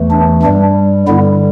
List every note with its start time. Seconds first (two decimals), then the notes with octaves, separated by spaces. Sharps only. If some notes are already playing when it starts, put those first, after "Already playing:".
Already playing: E2 E3 A3
0.11 D4
0.43 G2 G3 D4
1.08 G2 D3 G3 B3 E4